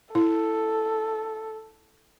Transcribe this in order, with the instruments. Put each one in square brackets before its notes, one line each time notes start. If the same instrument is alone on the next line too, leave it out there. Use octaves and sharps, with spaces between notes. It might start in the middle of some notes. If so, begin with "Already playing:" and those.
[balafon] E4 [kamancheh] A4